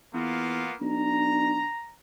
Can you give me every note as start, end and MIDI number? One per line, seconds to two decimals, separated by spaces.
0.14 0.65 40
0.14 0.73 58
0.14 0.73 59
0.14 0.73 65
0.81 1.62 35
0.81 1.68 62
0.81 1.93 82